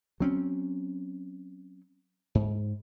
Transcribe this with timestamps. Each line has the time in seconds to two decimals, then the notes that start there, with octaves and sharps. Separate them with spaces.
0.20 F#3 C4 C#4
2.35 G#2